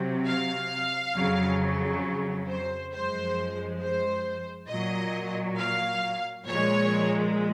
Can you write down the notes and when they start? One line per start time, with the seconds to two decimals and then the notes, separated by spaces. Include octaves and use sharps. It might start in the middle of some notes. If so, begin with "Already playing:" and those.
Already playing: C3 F#3
0.27 F5
1.16 F2 C#3 F#3
2.48 C5
2.93 F#2 F3 G#3 C5
3.82 C5
4.70 A#2 F#3 D#5
5.59 F5
6.47 A#2 F3 G#3 C#5